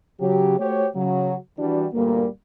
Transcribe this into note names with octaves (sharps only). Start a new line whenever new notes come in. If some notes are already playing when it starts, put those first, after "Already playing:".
C#3 F#3 G4
A3 F#4 G4 C5 C#5
C#3 F#3
E3 G3 D4 F#4
G1 D2 A#2 G3 A#3